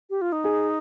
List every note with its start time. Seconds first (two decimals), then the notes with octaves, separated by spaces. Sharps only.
0.10 G4
0.21 F4
0.32 D#4
0.44 G#4